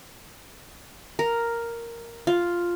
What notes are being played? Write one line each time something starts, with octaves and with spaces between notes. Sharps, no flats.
A#4
F4